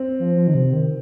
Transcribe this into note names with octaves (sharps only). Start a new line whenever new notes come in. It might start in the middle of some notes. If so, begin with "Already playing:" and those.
Already playing: C4
F3
F3
D#3
C3
D#3